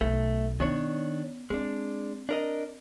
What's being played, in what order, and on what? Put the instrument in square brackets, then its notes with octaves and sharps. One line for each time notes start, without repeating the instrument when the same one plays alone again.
[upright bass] B1 [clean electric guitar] A3
[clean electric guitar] D#3 D4 C#5 [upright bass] B3 C#4
[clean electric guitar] G#3 D4 [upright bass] C4
[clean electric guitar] D4 A#4 D#5